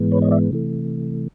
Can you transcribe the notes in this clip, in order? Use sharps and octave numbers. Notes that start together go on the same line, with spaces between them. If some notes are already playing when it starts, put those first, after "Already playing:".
Already playing: G#2 E3 G#3 B3
B4 C#5
C#5 D#5
D5 E5
C3 E3 A3